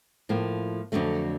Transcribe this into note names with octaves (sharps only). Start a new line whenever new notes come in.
A2 F3 A#3
F2 D3 F#3 A3